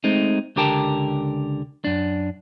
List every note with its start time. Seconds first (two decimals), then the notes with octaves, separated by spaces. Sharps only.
0.04 G#3 A3 C4 D#4
0.56 C#2 D3 G4 A#4 G5 A5
1.84 F#2 D4